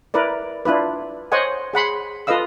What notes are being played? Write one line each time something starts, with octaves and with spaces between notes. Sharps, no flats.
E4 A#4 B4 D5
D4 E4 F4 B4
C5 C#5 D#5 F#5 G#5
G#4 F#5 B5 C6
F4 A4 B4 D#5 F5 E6